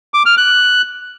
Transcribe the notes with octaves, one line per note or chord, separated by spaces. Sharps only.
D6
F6
F#6